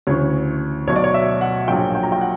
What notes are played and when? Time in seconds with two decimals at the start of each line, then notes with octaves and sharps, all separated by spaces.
0.07 D2 C#3 E3 C#5
0.87 B1 B2 F#3 C#5
0.96 D5
1.04 C#5
1.14 E5
1.41 F#5
1.68 A#1 A#2 F#3 G5
1.95 G5
2.03 A#5
2.12 G5
2.21 F#5